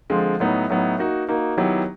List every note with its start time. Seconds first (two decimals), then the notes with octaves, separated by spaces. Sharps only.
0.10 D3 F3 G#3 C4 F4
0.40 A2 F#3 B3 D#4
0.70 A2 F#3 B3 D#4
0.99 A#3 D#4 F#4
1.29 A#3 D#4 F#4
1.57 D#3 F#3 B3 E4 G4